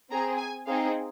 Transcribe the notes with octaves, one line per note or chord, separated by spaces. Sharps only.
C4 G#4 A#5
G#5
C4 D#4 G#4 F5